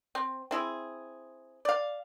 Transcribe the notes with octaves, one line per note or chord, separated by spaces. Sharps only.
C4
C4 E4 G#4
D5 F5